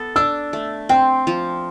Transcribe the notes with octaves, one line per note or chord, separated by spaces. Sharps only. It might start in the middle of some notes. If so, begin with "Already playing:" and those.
Already playing: B3 A4
D4 E6
A3
C4 G5
F3